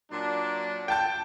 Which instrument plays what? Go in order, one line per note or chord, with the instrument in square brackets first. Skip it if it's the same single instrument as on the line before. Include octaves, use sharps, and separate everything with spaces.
[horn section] A#2 F#3 D4
[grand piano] G5 A5 G6